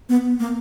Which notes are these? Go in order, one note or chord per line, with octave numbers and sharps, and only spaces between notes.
B3
A#3